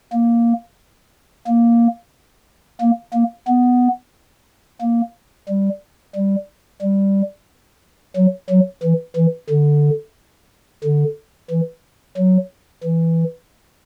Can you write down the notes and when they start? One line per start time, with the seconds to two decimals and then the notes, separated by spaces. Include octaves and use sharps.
0.13 A#3
1.47 A#3
2.81 A#3
3.14 A#3
3.48 B3
4.81 A#3
5.49 G3
6.16 G3
6.82 G3
8.16 F#3
8.50 F#3
8.83 E3
9.16 E3
9.50 D3
10.84 D3
11.51 E3
12.17 F#3
12.84 E3